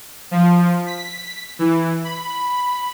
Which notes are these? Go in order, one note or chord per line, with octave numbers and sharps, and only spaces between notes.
F3
B6
E3
B5